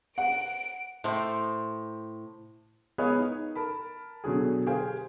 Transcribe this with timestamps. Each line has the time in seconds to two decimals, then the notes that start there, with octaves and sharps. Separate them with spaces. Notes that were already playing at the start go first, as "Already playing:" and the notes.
0.18 F#5 D7
1.04 A2 C5
2.98 B3 G#4 A#4 C#5 D#5 F5
3.18 D#4
3.55 A#4 A5 B5
4.24 B2 D3 F#3 G#4
4.67 G4 G#4 A#4 C5 F5 G#5